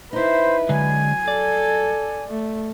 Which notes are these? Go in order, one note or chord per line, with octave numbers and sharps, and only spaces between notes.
D#4 E4 B4 C5
D3 F#3 G#3 G#5
A4 D5
A3